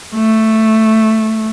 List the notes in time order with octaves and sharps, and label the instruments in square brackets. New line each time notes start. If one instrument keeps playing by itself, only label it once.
[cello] A3